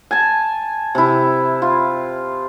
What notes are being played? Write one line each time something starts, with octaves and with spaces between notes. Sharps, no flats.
G#5 A5
C3 E4
F4